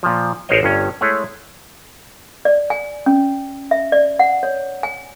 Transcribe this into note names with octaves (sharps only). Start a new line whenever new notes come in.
A#2 F3
A1 G#4 A#4 C5 C#5 D#5
G1 G2 C#4
G#3 A3 E4 G#4 C#5
D5
G#5
C#4
E5
D5
F#5
C#5
G#5